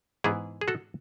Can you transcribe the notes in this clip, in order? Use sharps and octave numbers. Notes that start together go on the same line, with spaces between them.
G#2 E3 B3 E4 G#4
G#4
F#4 A4